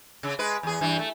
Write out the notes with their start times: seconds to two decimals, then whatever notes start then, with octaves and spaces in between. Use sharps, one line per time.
0.23 C#3
0.39 G#3 B4
0.63 E2 G#4
0.81 G2 E3
0.99 A3